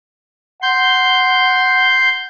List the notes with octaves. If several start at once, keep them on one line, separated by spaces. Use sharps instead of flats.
F#5 C6 G6